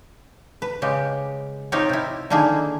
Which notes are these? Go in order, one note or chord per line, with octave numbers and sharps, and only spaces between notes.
B4
C#3 G#3 G4
C4 D#4 F4 G4 A#4 C#5
C3 E4
D3 D#3 A#3 E4 G#4